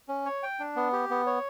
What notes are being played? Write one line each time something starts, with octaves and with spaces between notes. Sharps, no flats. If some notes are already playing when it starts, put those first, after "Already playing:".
C#4
C#5
G5
D4
B3
G4
B3
C#5